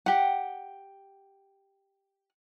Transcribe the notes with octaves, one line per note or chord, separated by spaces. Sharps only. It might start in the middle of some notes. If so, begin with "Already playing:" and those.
G4 F#5